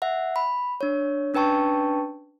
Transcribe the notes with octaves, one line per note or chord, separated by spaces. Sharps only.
E5 F#5
B5
D4 C#5
C#4 D4 B4 G5 A5 C#6